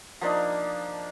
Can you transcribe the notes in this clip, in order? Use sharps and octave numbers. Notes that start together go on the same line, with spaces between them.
F3 A#3 D4 D#4